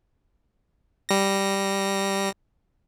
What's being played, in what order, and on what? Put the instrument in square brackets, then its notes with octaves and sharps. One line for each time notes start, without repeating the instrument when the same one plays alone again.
[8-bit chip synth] G3 A#6